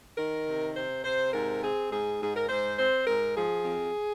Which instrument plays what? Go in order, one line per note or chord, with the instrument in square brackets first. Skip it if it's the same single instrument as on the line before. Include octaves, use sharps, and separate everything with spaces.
[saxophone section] D#3 A#4
C3
C3 C5
C3 C5
G#2 A#4
C4 G#4
G#2 G#4
G#2 G#4
A#4
G#2 C5
C4 C5
G#2 A#4
F3 G#4
F2